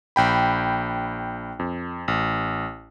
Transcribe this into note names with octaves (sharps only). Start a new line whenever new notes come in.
A#1 G5 B5
F2
A1